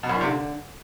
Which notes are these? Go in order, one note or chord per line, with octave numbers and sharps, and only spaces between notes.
B2
F#2
A#2
C3
D3